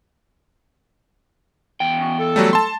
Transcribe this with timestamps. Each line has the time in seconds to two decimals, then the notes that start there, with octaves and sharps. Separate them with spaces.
1.80 E2 G5
1.99 B3 C#4 F#4
2.19 A4
2.36 F#3 G3 A3
2.53 A5 C6